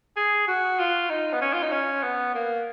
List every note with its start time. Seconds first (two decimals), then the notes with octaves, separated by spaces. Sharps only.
0.17 G#4
0.48 F#4
0.79 F4
1.10 D#4
1.33 B3
1.41 C#4
1.53 F4
1.63 D#4
1.72 C#4
2.03 B3
2.35 A#3